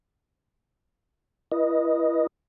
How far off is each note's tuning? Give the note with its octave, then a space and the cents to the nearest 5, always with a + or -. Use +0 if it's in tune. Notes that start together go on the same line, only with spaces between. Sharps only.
E4 +25 B4 -35 D#5 +0